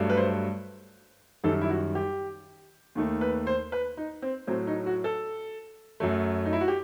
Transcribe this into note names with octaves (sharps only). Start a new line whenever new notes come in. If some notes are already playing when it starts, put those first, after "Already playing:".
Already playing: G2 F#3 A3
B4
C5
F#2 D#3 G3 A4
E4
F#4
G4
D#2 D#3 A3
B4
C5
B4
D#4
C4
A2 F#3 A3 C4
D#4
F#4
A4
F#2 F#3 A3
D#4
E4
F#4
G4